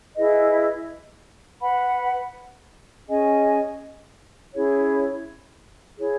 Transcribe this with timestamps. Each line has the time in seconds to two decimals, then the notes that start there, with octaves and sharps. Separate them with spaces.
0.16 E4 G#4 B4 D#5
1.62 B4 F#5 B5
3.08 C#4 G#4 D#5 G#5
4.53 C#4 E4 G#4 C#5
5.99 E4 G#4 C#5